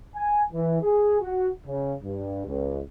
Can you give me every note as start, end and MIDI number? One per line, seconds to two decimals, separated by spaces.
0.16 0.42 80
0.53 0.80 52
0.82 1.19 68
1.21 1.48 66
1.66 1.94 49
2.03 2.45 43
2.47 2.80 37